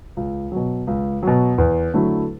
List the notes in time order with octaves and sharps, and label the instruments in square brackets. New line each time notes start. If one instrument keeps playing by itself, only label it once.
[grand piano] C#2
B2 F#3
C#2
B2 F#3
E2
D3 F#3 A3 E4